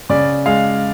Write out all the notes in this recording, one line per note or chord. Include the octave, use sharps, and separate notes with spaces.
C#3 D5
G#3 F5